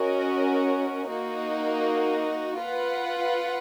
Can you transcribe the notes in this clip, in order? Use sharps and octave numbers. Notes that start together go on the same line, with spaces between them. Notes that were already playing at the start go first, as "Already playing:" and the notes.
Already playing: C#4 F#4 A#4 D#5
A#3 D#4 F#4
F4 B4 F#5